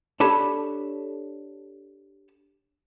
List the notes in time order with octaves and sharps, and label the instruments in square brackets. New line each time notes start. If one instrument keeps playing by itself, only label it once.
[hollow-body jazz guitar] D4 G4 A4 C#5 A5 B5